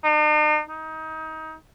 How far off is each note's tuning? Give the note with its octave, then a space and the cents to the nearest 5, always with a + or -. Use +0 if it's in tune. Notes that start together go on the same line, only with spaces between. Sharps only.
D#4 -45
D#4 +25